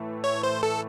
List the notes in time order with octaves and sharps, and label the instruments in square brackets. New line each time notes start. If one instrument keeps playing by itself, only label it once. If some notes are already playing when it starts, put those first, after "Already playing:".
Already playing: [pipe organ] A2 E3 A3
[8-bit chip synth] C#5
C5
A4